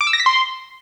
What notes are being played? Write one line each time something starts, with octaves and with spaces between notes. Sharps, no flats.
D6
E6
A#6
B6
C6